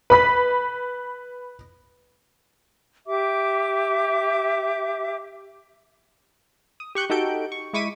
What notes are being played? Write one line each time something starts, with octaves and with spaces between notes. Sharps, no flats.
B4 B5 B6
G4 E5 D6
D#6
G4 C#6 F#6 G6
D#4 F#4 G4 A4 G6 D7
C#6
G#3 E4 C#6 D6 B6 D#7